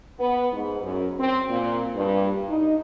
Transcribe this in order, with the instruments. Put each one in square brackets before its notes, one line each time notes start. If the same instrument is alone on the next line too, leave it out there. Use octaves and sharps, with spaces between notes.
[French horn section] B3
G#2
F#2
C4
A#2
G2
D#4